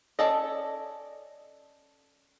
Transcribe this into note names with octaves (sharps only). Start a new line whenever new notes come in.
C#4 A4 D5 D#5